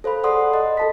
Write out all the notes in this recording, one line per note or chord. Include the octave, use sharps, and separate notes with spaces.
A4 C5 F5 B5
G#4 A4 D5 F#5 C6 D#6
D#5
A4 A5 B6